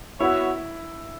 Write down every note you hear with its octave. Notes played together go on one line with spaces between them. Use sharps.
B3 E4 F#4 C#5 E5